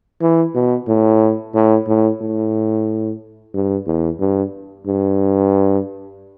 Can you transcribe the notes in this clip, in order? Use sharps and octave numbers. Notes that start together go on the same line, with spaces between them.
E3
B2
A2
A2
A2
A2
G2
E2
G2
G2